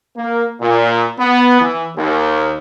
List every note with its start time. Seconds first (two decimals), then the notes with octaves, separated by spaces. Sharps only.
0.17 A#3
0.61 A#2
1.19 B3
1.60 E3
1.97 D#2